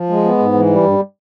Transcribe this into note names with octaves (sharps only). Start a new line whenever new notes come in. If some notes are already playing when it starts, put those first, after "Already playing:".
Already playing: F3
G#3
B3
G#2
E3
G3
G2